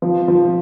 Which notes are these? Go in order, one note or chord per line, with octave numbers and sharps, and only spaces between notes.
F3
F3